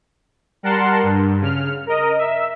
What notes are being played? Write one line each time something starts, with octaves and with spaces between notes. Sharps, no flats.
G3 A#4 F#5 A5 C6
G2
C#3 F6
A#4 D#5
E5